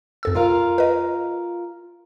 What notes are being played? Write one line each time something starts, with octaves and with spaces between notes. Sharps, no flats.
F2 A4 E6
F4 A#4 F5
B4 D#5